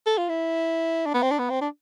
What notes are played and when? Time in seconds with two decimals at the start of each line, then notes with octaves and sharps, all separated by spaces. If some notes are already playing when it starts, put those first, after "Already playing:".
0.06 A4
0.18 F4
0.29 E4
1.06 D4
1.14 B3
1.23 C4
1.31 D4
1.39 B3
1.50 C4
1.61 D4